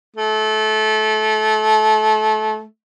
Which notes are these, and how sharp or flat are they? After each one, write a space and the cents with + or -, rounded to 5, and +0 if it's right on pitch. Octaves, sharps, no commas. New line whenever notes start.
A3 -25